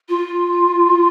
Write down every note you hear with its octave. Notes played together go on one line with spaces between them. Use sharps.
F4